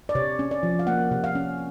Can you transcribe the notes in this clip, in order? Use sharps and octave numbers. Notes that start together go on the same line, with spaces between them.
D5
C3 C#5
C#4
D5
F3
F5
A#3 F#5
C3
F5
C#4